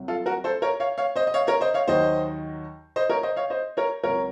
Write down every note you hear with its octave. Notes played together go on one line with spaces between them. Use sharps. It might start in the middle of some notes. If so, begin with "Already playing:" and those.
Already playing: C2 C3 F#3
F4 A4
F#4 A#4
A4 C5
A#4 C#5
C#5 F5
C#5 F5
C5 D#5
D#5
C#5 F5
A#4 C#5
C5 D#5
C#5 F5
D#2 D#3 F#3 C5 D#5
C5 D#5
A#4 C#5
C5 D#5
C#5 F5
C5 D#5
A#4 C#5
C#2 C3 F#3 A#4 C#5